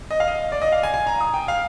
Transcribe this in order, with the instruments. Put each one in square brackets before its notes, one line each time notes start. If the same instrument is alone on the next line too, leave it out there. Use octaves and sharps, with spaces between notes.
[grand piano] D#5
F5
D#5
D5
D#5
F5
G#5
G#5
A#5
D#6
G5
F5